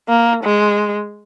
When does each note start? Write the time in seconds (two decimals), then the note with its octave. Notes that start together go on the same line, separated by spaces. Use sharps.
0.09 A#3
0.44 G#3